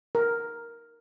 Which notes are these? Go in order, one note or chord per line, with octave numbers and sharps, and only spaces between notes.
A#4